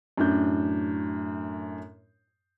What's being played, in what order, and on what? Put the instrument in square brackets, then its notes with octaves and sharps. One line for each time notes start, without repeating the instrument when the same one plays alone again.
[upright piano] F#2 A2 D4 G6